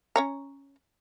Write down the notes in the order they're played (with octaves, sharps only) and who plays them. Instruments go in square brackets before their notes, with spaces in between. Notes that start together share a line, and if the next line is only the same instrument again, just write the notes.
[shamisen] C#4 C#5 A#5